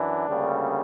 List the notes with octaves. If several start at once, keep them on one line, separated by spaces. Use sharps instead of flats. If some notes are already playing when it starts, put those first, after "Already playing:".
Already playing: F#2 E3 D4
D2 C#3 G3 A#3